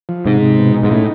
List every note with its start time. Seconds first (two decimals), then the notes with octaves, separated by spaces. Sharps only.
0.09 F3
0.26 G#2 C3
0.42 C3
0.58 B2
0.74 D#4
0.83 G#2
0.91 A2 C#4